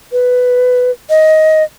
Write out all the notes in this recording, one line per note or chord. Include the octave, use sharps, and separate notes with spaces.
B4
D#5